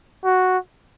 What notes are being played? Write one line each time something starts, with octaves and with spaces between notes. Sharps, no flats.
F#4